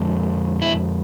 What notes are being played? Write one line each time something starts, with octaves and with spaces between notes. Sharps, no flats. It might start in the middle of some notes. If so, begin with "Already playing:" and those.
Already playing: F2 D3 G#3
E4